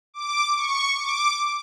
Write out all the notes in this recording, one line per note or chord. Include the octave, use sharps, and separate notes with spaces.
D6
C#6
D6